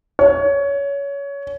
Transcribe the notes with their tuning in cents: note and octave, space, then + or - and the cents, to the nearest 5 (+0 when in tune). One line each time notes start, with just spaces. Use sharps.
C#5 +20